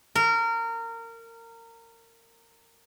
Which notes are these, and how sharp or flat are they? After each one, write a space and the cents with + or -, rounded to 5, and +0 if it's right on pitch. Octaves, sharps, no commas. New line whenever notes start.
A#4 -25